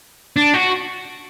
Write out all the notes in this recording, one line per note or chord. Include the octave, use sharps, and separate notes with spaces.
D4
F#4